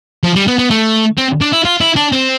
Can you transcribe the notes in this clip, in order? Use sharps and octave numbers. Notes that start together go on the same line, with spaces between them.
F3
G3
B3
B3
A3
C4
D4
E4
F4
E4
D4
C4